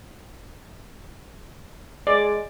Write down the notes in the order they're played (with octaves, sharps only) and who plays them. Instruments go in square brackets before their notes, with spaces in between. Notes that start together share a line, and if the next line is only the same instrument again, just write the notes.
[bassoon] G#3 [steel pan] D5